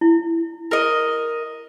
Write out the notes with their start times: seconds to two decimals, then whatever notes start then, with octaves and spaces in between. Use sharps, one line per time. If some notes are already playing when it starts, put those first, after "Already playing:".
0.01 E4
0.71 A#4 D#5